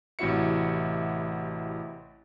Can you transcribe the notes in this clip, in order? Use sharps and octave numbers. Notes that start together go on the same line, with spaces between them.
A1 C3 E4 F#4 E5 C#7